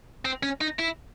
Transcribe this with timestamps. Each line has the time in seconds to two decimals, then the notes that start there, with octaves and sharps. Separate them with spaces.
0.25 C4
0.43 C#4
0.61 D#4
0.79 E4